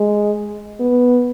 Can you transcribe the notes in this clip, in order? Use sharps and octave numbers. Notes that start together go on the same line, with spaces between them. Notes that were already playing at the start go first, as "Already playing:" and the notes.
Already playing: G#3
B3